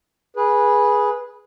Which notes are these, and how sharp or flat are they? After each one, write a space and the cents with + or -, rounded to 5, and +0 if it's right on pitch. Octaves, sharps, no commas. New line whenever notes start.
G#4 +0 B4 -15